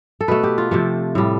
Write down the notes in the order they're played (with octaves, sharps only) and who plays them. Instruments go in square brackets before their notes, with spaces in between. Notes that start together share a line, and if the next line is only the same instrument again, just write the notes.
[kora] A4
B2 A3 B4
G4
F4
C3 F3 A3
A2 G3